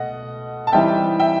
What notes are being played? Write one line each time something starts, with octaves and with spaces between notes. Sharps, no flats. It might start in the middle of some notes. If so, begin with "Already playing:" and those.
Already playing: B2 A3 D#5 F#5
A5
E3 G3 C4 D#4 E5 G5
E5 G5